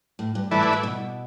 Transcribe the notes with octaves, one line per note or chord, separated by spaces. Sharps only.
A2
G2
G2 E3 A3 E4 B4 D5
G2
A2
B2